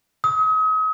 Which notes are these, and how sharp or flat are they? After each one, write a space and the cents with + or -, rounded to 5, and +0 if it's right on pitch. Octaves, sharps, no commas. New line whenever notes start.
D#6 +40